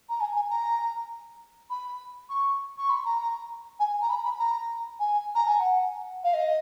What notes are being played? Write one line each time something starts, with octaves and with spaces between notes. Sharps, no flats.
A#5
G#5
G#5
A#5
B5
C#6
C#6
B5
A#5
G#5
A#5
B5
B5
A#5
G#5
A#5
G#5
F#5
F5
D#5